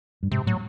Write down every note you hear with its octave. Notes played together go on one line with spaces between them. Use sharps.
G2
G#2 C3
A2 F#3